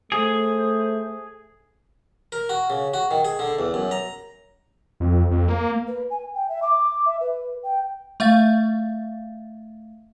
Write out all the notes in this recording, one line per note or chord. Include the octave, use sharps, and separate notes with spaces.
A3 G#4 C5
A#4
F#4
C#3
F#4
D#3
G#4
D3
E2
F#2
A#5
F2
F2
A#3
B4
G#5
G5
E5
D6
E5
B4
G5
A3 E5 F5 A6